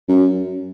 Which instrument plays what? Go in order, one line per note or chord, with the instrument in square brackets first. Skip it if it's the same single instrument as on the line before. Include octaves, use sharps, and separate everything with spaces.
[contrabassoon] F#2